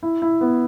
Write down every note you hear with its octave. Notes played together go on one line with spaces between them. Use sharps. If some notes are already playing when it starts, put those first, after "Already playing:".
E4
E4
B3